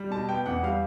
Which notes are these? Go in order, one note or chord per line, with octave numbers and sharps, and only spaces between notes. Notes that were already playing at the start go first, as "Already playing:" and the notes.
Already playing: G3
B2 A5
B3 G5
E2 F#5
G3 F5